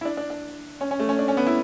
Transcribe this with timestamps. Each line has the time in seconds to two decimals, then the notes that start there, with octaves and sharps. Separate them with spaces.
0.01 E4
0.05 D4
0.17 D4
0.30 D4
0.81 C#4
0.91 C#4
1.00 A3
1.09 C#4
1.19 D4
1.28 C#4
1.37 B3
1.47 E4